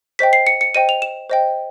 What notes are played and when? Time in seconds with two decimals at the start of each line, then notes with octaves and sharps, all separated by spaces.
0.19 C5 D#5 G5 B6
0.33 C7
0.47 C#7
0.61 C#7
0.75 C5 D#5 G5 D#7
0.89 F7
1.02 E7
1.30 C5 D#5 G5